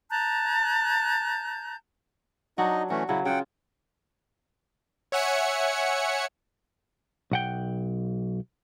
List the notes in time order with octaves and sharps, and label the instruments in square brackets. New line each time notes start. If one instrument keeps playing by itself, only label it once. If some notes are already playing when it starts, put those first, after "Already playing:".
[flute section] A5 A#5 F#6 G6
[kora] F#3 D4 F#4 [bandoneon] D#4 D#5
[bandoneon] E3 A3 C#4 [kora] F#4
[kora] C#3 F#3 [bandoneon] E4
[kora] C#3 F4 [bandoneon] F#5 G5
[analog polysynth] C#5 E5 F#5 G#5 C#7
[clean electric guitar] B1 F#5 G5